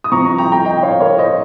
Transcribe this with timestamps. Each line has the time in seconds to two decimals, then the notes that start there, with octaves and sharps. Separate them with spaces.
0.04 D#6
0.12 F3 C4 A#5 C#6
0.25 A#5 C#6
0.38 G5 A#5
0.52 G5 A#5
0.65 D#5 G5
0.77 G5
0.83 C#5 F5
1.00 A#4 C#5
1.18 C5 D#5